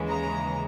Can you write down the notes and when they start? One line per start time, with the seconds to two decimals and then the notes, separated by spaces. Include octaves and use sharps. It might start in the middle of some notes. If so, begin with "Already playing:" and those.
Already playing: D#2 C#3 E3 G#3
0.10 A#5